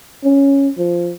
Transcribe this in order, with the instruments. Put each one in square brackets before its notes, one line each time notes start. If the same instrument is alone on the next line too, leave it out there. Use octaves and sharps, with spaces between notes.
[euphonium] C#4
F3